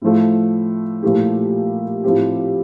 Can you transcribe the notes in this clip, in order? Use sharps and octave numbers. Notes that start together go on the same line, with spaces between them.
A2 F3 A3
A#2 F3 A3 E4 G4
A2 F3 C4 G4